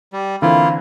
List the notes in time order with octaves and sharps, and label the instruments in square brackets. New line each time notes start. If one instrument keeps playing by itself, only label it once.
[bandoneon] G3
[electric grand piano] D3 E3 C4 [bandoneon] A#3 E4 F4